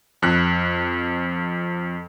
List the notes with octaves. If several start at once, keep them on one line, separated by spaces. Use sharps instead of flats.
F2 F#6